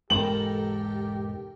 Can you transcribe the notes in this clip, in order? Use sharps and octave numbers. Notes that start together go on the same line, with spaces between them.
E1 G#2 G#3 G4 A4 A#4 G5 F#7